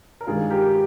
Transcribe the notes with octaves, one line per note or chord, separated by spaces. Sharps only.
A#4
G2 D#3 G#3 F4 G#4
G4 A#4
G4